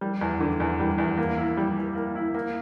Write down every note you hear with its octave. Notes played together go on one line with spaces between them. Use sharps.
G3
E2
D3
E2
G3
E2
A#3
E4
G3
E3
A#3
E4
A#3